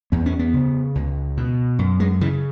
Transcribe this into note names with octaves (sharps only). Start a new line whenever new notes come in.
E2 B3
C#4
B3
C#3
C#2
B2
F#2
G#3
C#3 E3